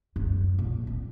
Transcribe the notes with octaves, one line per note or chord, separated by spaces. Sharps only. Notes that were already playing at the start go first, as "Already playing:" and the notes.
F#2 G#3
A#2
C4